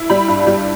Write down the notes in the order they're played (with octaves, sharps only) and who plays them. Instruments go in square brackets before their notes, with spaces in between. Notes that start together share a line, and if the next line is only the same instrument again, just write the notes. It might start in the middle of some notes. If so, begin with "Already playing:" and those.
Already playing: [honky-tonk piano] E4
G3 B5
G2
G3